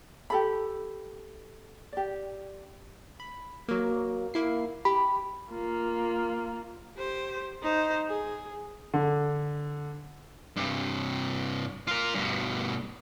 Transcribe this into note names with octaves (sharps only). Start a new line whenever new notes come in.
G4 A4 B5
G4 D5
B5
F#3 A#3
A#3 E4 C7
G4 B5
A#3 F4
G4 C5
D#4 C5
G#4
D3
G2 C3
F4 A#4
G2 B2